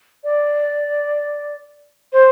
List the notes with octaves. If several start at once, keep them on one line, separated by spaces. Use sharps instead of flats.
D5
C5